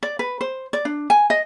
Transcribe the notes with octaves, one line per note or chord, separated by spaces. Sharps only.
D5
B4
C5
D5
D4
G#5
D#5